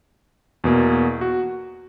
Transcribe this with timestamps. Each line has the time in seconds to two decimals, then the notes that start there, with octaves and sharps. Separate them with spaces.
0.64 E2 B2 A#3
1.21 F#4